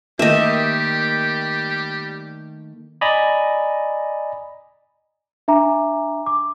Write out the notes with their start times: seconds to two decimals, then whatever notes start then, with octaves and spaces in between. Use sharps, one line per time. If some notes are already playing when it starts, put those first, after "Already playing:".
0.19 D#3 G3 A3 A#3 G4 D#5 E5
3.01 D5 D#5 G#5 A#5 B5
5.48 D4 E5 G#5 A#5 D6
6.26 D6